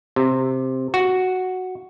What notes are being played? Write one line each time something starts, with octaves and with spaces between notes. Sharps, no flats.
C3
F#4